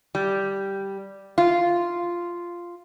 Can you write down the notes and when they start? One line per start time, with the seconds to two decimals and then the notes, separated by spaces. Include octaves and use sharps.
0.15 G3
1.38 F4